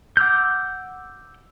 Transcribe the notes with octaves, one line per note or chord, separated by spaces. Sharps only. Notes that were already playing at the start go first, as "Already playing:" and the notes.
F#5 D6 E6 F6 G6